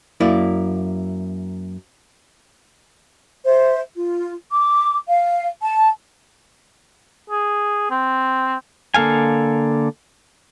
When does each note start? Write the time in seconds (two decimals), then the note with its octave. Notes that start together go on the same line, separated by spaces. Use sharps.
0.20 F#2 A#3 E4 D5
3.45 C5 E5
3.96 F4
4.51 D6
5.08 F5
5.61 A5
7.30 G#4
7.91 C4
8.94 D3 A#3 A4 F5 G#5